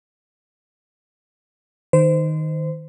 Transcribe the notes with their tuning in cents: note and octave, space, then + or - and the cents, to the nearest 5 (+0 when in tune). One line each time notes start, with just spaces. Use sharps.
D#3 +0 C5 -25